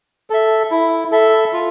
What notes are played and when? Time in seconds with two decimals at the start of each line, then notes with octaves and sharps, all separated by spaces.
0.30 A4 E5
0.71 E4
1.12 A4 E5
1.53 F4